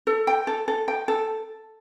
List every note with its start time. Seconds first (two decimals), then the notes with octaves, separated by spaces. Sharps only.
0.07 A4
0.27 G5
0.47 A4
0.68 A4
0.88 G5
1.08 A4